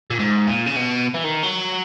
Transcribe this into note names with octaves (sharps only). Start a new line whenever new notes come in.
A#2
G#2
A#2
C#3
B2
E3
D#3
F#3